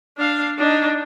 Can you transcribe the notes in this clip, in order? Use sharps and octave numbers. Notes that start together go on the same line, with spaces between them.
D4 F5
D4 D#4